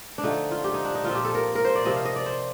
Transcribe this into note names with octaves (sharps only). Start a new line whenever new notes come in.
D4
D3 F3 A3 D#4
F4
G4
D#4
D4
D#4
A#2 F3 C4 F4
G4
A4
A#4
A#4
C5
D5
C3 F3 C4 D#5
F5
D#5
D5
C5